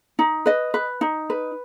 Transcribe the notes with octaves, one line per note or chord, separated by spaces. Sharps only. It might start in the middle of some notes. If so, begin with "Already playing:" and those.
D#4
B4 D#5
B4
D#4
B4